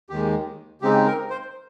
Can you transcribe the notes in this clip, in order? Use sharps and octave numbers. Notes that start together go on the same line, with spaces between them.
D#2 D#3 G#3 G4
C#3 G#3 C4 D#4 G4
A#4
C5